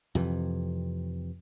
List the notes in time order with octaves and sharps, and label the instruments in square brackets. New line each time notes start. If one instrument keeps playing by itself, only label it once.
[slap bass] F2 C3 E3